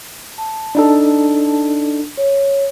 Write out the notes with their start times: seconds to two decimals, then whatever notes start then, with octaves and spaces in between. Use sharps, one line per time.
0.38 A5
0.75 D4 D#4 A4
2.17 C#5